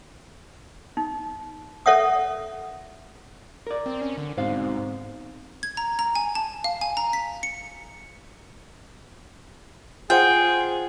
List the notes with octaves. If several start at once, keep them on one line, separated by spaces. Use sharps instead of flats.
D#4
A4 C#5 E5 F#5 D#6
A#4 D5
C4
C#4
D3
D2 G#2 B2 C4 D#4 C5 F5
G#6
A#5
A#5
G#5
A5
F5
G#5
A#5
B6
C#7
F4 G#4 C5 F#5 G5